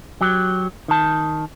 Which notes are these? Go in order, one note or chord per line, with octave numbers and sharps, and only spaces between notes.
F#3 G4
D#3 A5